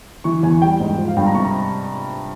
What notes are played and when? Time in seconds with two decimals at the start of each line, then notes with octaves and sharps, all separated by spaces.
0.24 E3 C#6
0.43 E2 G#5
0.62 G3 G5
0.80 G#2
0.98 F3
1.08 F5
1.17 G2 G5
1.26 A#5
1.35 C3 C#6
1.45 A#5